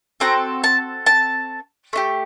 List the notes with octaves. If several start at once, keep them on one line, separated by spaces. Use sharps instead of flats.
C4 F#4 A4 A#5
A5
A5
A3 D#4 G4